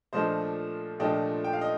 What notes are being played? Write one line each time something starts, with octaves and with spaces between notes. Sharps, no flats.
A#2 F3 A3 D4 C5 D#5
A#2 F3 A3 D4 D#5 G5
G5
F5
D#5